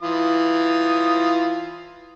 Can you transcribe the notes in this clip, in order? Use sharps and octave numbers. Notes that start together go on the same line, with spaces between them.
E3 F4 D#6